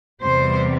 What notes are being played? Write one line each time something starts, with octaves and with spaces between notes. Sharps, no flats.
E2 C3 G3 C5